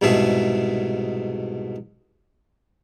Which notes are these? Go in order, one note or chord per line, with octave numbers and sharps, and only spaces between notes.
C2 G#2 B2 A3 G#4 E5